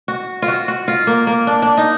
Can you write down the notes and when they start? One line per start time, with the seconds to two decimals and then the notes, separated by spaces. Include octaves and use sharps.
0.08 F#4
0.42 F4
0.48 F#4
0.68 F#4
0.88 F4
1.07 A#3
1.27 A#3
1.47 D4
1.62 D4
1.77 D#4